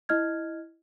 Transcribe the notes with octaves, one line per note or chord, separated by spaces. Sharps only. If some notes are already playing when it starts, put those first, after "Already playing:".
E4 D#5 F6 G#6